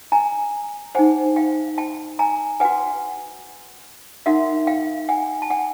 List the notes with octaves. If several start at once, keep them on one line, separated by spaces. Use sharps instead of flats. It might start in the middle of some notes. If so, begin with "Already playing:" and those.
G#5 A#5
D#4 G#4 C5 F#5 G#5
F5 G5
G5 A5
G#5 A#5
F#4 B4 F#5 G#5
D#4 F#4 A#4 E5 F#5
F5 G5
F#5 G#5
A5
F#5 G#5